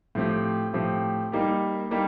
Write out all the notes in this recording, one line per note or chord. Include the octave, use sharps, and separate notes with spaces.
A2 F3 C4 G4
A2 F3 C4 G4
G3 A#3 D#4 G4
G3 A#3 D#4 G4